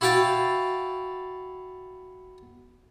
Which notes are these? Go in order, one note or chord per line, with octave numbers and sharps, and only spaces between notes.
E4 F#4 F5 G5 A5